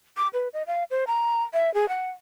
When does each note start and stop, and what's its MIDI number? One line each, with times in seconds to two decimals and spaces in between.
0.17 0.28 86
0.33 0.48 71
0.53 0.63 75
0.67 0.84 77
0.91 1.04 72
1.07 1.43 82
1.53 1.72 76
1.74 1.88 68
1.89 2.09 78